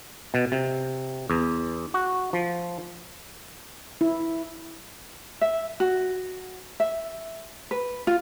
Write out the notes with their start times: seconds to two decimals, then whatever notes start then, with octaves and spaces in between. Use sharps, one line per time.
0.34 B2
0.52 C3
1.30 E2
1.94 F#4
2.33 F3
4.01 E4
5.41 E5
5.80 F#4
6.80 E5
7.71 B4
8.07 F4